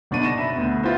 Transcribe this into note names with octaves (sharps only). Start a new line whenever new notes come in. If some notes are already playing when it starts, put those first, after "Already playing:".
F#1 B2 D4 D#4 C#6 D#7
A#6 E7
E5 B5
D2 B3
F4 F#4 B4 C5 E5